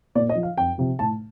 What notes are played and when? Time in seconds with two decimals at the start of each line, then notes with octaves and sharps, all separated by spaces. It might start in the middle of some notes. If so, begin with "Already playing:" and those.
0.15 A#2 D5
0.29 D#5
0.35 F3
0.43 F5
0.57 F2 G5
0.78 C3 F3
0.99 A2 A5